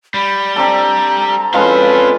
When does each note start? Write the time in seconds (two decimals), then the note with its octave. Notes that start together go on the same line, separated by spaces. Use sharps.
0.14 G3 B5
0.56 C4 D4 A4 A#5
1.54 G#3 C4 C#4 F4 A4 B4 F5